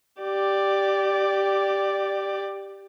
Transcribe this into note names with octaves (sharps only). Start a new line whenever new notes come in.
G4 D5